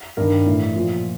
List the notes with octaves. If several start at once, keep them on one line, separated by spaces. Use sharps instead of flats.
G2 D#3 A#4
A2 E3
A#2 F3